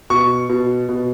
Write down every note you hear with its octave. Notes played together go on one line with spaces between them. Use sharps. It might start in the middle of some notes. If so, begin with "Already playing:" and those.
B2 C#6
B2
B2